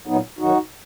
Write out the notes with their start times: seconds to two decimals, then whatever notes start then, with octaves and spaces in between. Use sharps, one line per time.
0.07 A#2 F#3 B3 D#4
0.39 F#2 D#3 F#3 D#4 F#4